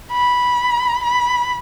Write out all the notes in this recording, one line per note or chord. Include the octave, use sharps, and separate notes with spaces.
B5
B5